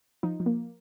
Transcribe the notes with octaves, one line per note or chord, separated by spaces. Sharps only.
F3 D#4
F3
A#3